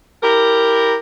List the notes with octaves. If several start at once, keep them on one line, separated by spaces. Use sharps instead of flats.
E4 G4 A#4